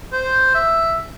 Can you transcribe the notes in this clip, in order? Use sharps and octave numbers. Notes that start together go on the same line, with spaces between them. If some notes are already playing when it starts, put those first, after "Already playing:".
C5
E5